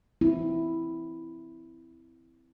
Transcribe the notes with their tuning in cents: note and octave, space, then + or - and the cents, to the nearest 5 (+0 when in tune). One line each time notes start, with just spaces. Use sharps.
C4 -20 E4 +0